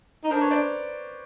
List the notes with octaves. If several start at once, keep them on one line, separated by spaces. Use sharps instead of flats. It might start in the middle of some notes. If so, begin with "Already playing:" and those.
D#4
D4 A#4 C5
B4 C#5
C5 D5